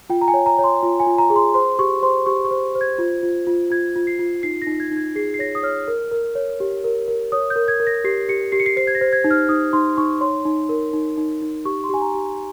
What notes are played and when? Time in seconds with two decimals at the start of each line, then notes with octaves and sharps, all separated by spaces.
0.10 F4 G5
0.21 A#5
0.28 G#5
0.34 C#5
0.46 A#5
0.58 C#5
0.64 C6
0.83 F4
1.00 G#5
1.07 F4
1.18 A#5
1.30 G#4
1.36 C6
1.54 C5 C6
1.79 G4 C#6
2.03 C5 C6
2.26 G4 C#6
2.44 C#6
2.51 C5
2.75 C5
2.81 G#6
2.98 F4
3.23 F4
3.47 F4
3.70 F4 G#6
3.96 F4
4.07 C7
4.19 F4
4.43 D#4 C7
4.62 A#6
4.67 D#4
4.80 G#6
4.91 D#4
4.97 G#6
5.16 G#4 C7
5.34 C7
5.39 C#5 A#6
5.55 D#6
5.63 C#5 F6
5.88 A#4
6.12 A#4
6.35 C#5
6.60 G4
6.84 A#4
7.08 A#4
7.32 C#5 D#6
7.50 G6
7.56 A#4
7.68 G#6
7.80 A#4
7.87 A#6
8.04 G4 C7
8.29 G4 C#7
8.52 G4 C7
8.60 C#7
8.66 C7
8.77 C5 C7
8.87 G#6
8.95 A#6
9.01 C5
9.13 G#6
9.24 D#4
9.31 F6
9.49 D#4 D#6
9.73 D#4 C6
9.98 D#4 C#6
10.21 C#5 C6
10.45 D#4
10.69 A#4
10.93 D#4
11.17 D#4
11.42 D#4
11.65 G4 C#6
11.84 C6
11.89 G4 G#5
12.02 A#5
12.14 G4